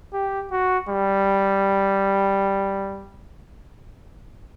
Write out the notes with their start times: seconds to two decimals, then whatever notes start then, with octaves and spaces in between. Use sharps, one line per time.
0.14 G4
0.52 F#4
0.89 G3